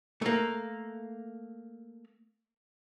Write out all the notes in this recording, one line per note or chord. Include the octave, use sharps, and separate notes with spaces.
A3 A#3